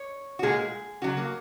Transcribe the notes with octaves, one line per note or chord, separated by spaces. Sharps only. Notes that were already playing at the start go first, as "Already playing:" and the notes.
Already playing: C#5
F#4
A#2 G#3 G#4
C#3 F#3 F#4
A#3